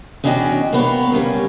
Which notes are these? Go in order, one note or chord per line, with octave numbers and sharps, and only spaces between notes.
E2 C#4 D4 F#4 D#5 G5
A#3 B3 C#5
C#3 G3 A#3 C#4